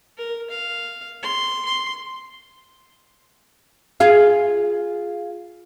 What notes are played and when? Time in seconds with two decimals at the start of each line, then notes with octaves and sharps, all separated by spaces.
0.18 A#4
0.51 F5
1.23 C6
1.66 C6
4.00 F4 G#4 F5